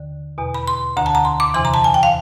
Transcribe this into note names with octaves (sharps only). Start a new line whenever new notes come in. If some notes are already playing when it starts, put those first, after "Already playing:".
Already playing: D#2 D3
E2 B2
B5
C6
D2 D3 A#5
A5
A#5
C6
D6
E2 C3 E3 C6
A#5
A5
G#5
G5
F5